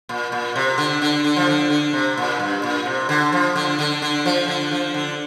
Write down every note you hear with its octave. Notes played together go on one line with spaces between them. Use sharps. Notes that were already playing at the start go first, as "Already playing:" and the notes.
A#2
A#2
C3
D3
D3
D3
F3
D3
D3
C3
A#2
G2
A#2
C3
D3
F3
D3
D3
D3
F3
D3
F3
D3